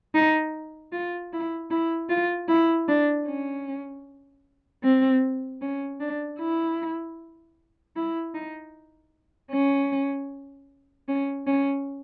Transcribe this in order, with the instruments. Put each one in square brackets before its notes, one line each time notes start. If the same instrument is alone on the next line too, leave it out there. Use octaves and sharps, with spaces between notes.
[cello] D#4
F4
E4
E4
F4
E4
D4
C#4
C4
C#4
D4
E4
E4
D#4
C#4
C#4
C#4